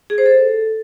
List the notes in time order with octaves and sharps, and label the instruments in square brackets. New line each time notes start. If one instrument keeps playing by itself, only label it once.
[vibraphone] G#4
C5
A4